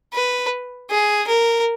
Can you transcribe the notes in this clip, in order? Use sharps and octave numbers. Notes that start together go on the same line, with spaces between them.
B4
G#4
A#4